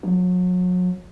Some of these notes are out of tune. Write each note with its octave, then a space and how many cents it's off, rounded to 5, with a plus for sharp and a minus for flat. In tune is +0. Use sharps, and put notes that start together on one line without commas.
F#3 -35